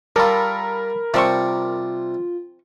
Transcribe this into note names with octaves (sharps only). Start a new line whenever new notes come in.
G3 F4 A4 A#4 A#5 B5
C3 F3 G3 C4 F4 D5 C#6